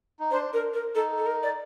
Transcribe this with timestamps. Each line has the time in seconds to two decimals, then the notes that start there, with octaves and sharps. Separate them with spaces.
0.20 D#4
0.31 D4 C5
0.53 A#4
0.74 A#4
0.95 D#4 A4
1.18 A4
1.26 A#4
1.43 D5